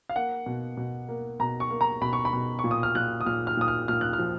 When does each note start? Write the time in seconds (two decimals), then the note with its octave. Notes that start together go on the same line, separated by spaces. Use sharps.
0.09 F5
0.15 A#3 F#5
0.46 B2
0.77 B2
1.09 A#3
1.40 B2 A#5
1.60 C#6
1.70 A#3
1.81 A#5
2.01 B2 B5
2.13 C#6
2.25 B5
2.33 B2
2.59 C#6
2.64 A#2
2.71 D#6
2.83 F6
2.95 A#2 F#6
3.21 D#6
3.26 A#2 F6
3.47 F6
3.57 A#2 D#6
3.68 F6
3.88 A#2 F6
4.01 F#6
4.13 F6
4.19 F3